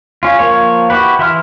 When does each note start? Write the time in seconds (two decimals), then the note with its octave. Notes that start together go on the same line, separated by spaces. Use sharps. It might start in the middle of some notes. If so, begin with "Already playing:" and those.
0.23 C#4 F4
0.39 F3 A#3 C#5
0.90 E4 F#4 G4 B4
1.19 E3 E4 E5 C6 F6